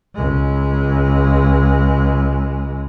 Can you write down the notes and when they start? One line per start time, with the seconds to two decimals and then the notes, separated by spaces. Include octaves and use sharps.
0.15 C#2 G#3